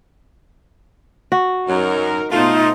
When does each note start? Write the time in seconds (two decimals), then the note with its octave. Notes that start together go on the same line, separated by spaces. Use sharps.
1.32 F#4
1.69 F#2 F#3 D#4 A#4
2.32 B2 A3 B3 D#4 F4 C5